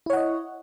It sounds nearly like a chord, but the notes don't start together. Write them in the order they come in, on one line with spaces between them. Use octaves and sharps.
E4 C#5 F#5 D#5